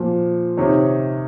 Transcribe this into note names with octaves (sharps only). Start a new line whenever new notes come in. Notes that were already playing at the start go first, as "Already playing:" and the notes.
Already playing: A#2 F3
C3 D#3 C#5